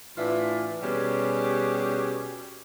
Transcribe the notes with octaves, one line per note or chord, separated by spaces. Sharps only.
A2 E3 D4 F4 E5
B2 G3 C#4 G4 G#4